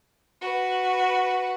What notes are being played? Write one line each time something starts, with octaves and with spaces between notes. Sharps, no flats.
F#4 B4